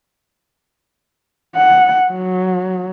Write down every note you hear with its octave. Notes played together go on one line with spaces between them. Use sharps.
F#5
F#3